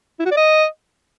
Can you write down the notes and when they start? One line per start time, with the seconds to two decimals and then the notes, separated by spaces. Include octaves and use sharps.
0.20 E4
0.25 F#4
0.31 D5
0.37 D#5